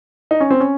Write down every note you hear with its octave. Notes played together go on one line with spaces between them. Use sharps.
D#4
C#4
C4
C#4